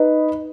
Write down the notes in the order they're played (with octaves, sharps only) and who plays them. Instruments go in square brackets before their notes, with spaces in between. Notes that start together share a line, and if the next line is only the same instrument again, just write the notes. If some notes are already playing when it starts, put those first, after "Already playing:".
Already playing: [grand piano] D#4 B4